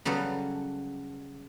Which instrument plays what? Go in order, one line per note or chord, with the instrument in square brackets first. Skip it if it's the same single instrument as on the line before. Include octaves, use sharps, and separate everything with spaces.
[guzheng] C#3 F#3 G3 B3 A4